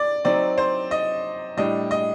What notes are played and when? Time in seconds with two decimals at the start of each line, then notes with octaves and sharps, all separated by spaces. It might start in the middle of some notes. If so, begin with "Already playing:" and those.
Already playing: D5
0.25 F#3 C4 D#4 D5
0.58 C5
0.91 D#5
1.57 A2 G3 D4 D#5
1.91 D#5